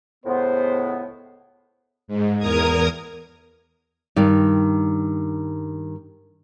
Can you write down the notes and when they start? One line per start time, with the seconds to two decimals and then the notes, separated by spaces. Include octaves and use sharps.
0.25 C#2 A2 B3 C5
2.08 G#2
2.38 E2 A#4 A#5 D#6 G#6
4.16 G2 D#3